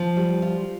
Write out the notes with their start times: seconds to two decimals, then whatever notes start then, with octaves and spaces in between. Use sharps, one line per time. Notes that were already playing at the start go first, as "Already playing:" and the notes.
Already playing: F3
0.16 G3
0.42 F4